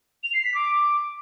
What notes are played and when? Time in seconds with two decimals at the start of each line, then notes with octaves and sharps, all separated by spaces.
0.24 F7
0.34 C7
0.44 B6
0.54 D6